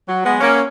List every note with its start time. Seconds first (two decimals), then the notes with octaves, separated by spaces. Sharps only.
0.08 F#3
0.25 G#3 B3
0.41 A#3 C#4